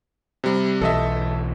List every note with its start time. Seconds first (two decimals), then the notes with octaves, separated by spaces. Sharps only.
0.44 C3 G3
0.82 B1 E3 A4 D#5 E5